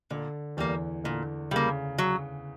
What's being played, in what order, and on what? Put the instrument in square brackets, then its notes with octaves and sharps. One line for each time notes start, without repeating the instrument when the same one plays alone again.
[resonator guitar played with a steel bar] A#2 [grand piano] D3
[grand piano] E2 E3 [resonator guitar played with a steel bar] G3 A#3
[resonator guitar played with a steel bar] A#2 [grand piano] D3
[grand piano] C#3 [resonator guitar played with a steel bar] G3 A#3
[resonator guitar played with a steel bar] F#3